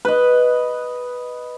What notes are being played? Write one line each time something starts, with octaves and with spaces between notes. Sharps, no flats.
B4 D#5